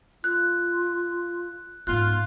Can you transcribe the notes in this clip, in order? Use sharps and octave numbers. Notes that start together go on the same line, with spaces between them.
F4 F#6
G#2 B3 F4 F#6